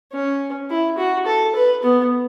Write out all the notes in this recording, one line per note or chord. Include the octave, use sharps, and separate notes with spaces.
C#4
E4
F#4
A4
B4
B3